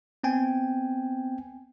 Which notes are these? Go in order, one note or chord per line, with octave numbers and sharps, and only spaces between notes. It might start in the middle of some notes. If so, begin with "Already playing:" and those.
B3 C4 G5 G#5